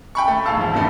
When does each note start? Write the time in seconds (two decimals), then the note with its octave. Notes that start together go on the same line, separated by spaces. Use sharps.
0.15 G5 B5 C#6
0.28 A3
0.45 E1 G#4 F5 A5 E6
0.57 G#2 F3
0.73 E2 G2 B2 A3